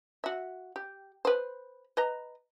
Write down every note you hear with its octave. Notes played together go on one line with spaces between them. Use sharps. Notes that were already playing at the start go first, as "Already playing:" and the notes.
F#4 E5
G4
B4 C5
B4 D#5 A#5